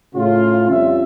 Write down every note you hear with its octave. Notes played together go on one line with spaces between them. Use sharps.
A2 C#3 F4
F2 G3 C#4 F4 E5